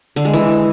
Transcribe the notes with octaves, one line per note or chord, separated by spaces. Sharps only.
D3
G#3
E3